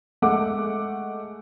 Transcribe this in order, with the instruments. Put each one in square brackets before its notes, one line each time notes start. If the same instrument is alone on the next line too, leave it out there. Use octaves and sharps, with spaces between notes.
[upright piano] G#3 A3 F#5 D6